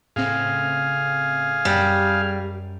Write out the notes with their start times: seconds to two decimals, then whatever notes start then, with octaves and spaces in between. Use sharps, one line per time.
0.16 A2 C#3 C4 G#4 F5
1.65 F#2 G3